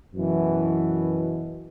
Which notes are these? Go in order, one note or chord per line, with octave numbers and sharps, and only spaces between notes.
F#2 B2 E3